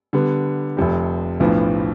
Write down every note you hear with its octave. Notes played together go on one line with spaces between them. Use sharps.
D3 G3 B3
F1 F2 C3
B1 A2 F3 B3 D4